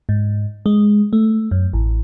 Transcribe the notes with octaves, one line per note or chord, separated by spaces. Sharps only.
G#2
G#3
A3
F#2
A1